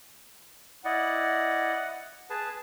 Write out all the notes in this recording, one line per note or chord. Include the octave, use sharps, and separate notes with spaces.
E4 D5 D#5 F#5
G#4 B4 A5